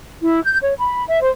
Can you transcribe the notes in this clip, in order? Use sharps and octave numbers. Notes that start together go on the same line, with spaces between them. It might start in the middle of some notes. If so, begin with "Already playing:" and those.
E4
G6
C#5
B5
E5
C5